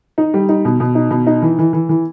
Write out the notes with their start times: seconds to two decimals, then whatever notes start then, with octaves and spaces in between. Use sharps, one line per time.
0.18 D#4
0.34 G3
0.49 D#4
0.65 B2
0.80 B2
0.95 D#4
1.11 B2
1.27 D#4
1.42 E3
1.59 E3
1.73 E3
1.89 E3